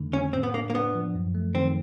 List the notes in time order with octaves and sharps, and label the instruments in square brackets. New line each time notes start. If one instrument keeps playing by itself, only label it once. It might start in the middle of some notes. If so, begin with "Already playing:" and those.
Already playing: [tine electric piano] F2 D3 D#3 A3
[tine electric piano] D3 [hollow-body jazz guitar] C#4
[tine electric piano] A2 [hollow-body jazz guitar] C4
[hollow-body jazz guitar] B3
[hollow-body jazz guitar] A#3 [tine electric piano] D4
[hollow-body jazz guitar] A#3
[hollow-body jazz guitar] B3 [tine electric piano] D4
[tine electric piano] F3
F#2
A3
[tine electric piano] D#3 [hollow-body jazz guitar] C4